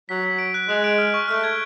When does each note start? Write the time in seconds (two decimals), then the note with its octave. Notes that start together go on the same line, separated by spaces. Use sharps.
0.09 F#3 B6
0.24 B6
0.39 D7
0.54 F#6
0.69 G#3 F#6
0.84 D7
0.98 F6
1.14 C#6
1.28 A3 F6
1.44 G#6